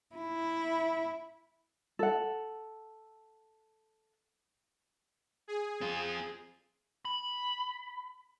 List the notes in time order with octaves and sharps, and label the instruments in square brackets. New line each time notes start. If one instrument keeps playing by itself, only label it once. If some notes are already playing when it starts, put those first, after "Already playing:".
[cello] E4
[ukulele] A4 F#5
[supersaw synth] G#4
[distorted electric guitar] C4 F4
[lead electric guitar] B5